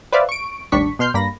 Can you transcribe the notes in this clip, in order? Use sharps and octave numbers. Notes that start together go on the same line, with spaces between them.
B4 C5 D5 E5 F5
C#6 D7
A1 D#2 G3 D4 C#6 B6
B2 C6 F6 G6 C7
G2 A#3 B5 A#6